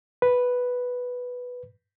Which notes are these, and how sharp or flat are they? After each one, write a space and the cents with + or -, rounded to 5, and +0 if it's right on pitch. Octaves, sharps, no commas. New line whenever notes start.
B4 +0